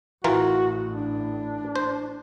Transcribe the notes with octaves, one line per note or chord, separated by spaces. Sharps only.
A1 A2 E3 F4 F#4 A#4
D4
C5